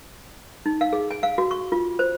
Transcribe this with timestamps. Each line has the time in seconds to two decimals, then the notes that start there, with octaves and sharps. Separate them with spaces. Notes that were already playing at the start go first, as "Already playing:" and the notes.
0.66 D#4
0.81 F5
0.93 G#4
1.11 G#5
1.23 F5
1.38 F#4
1.51 C#6
1.72 F4
1.99 C5